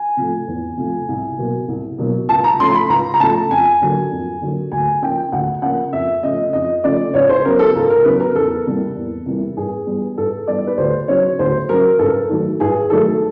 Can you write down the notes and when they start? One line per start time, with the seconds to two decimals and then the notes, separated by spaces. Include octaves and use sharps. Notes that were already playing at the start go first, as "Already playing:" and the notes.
Already playing: G#5
0.17 C3 F3 A3
0.48 E2
0.78 C3 F3 A3
1.09 C2
1.38 B2 F#3 A#3
1.68 C2
1.98 B2 F#3 A#3
2.29 C#2 A5
2.44 A#5
2.60 C#3 F3 A3 C6
2.75 B5
2.89 C#2 A#5
3.14 A#5
3.20 C#3 F3 A3 A5
3.50 F2 G#5
3.81 D3 F#3 A#3
4.12 F2
4.41 D3 F#3 A#3
4.72 D2 G#5
5.02 C#3 F3 A#3 G5
5.32 D2 F#5
5.62 C#3 F3 A#3 F#5
5.93 F2 E5
6.23 C#3 F3 A3 D#5
6.53 F2 D#5
6.84 C#3 F3 A3 D5
7.14 C#2 C#5
7.29 C5
7.45 C#3 F#3 B3 A#4
7.59 A4
7.75 C#2 A#4
7.90 A#4
8.05 C#3 F#3 B3 B4
8.20 A#4
8.36 E2 A4
8.66 C3 E3 G3 A#3
8.97 E2
9.26 C3 E3 G3 A#3
9.57 G2 G#4
9.87 E3 G3 B3
10.18 G2 A4
10.48 E3 G3 B3 D5
10.67 B4
10.78 D2 C5
11.08 C#3 F#3 C#5
11.39 D2 C5
11.69 C#3 F#3 A#4
11.99 G2 A4
12.29 D#3 F#3 A3
12.60 G2 G#4
12.90 D#3 F#3 A3 A4